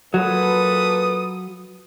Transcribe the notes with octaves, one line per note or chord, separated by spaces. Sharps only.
A#2 F#3 A4 B4 D#6